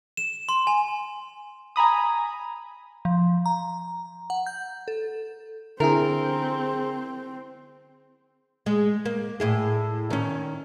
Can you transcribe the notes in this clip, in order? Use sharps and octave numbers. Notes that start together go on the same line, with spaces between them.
E7
C6
G#5
G#5 A#5 B5 D#6
F3
A#5
F#5
G6
A4
D3 C4 E4 G#4 A#4
G#3
A#3
A2 E4 G#4
D#3 C#4